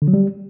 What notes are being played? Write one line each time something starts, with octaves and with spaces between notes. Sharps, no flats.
D3
F#3
G3